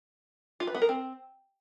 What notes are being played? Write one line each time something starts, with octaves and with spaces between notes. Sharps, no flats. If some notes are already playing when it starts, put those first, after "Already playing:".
F4
B4
B3
A#4
C4